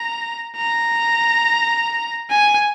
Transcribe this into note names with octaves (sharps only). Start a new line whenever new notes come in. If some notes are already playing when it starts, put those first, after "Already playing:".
Already playing: A#5
A#5
G#5